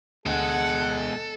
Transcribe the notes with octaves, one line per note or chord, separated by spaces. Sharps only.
D2 B2 G#3 G#4 A4 F#5